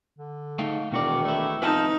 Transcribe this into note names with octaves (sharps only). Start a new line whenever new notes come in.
D3
G#2 A3 F5 G5
E1 B2 D#3 F#4 D5
A3 E4
F1 D#4 F4 B4 G#5 A5